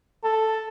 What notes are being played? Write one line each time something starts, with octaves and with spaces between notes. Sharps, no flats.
A4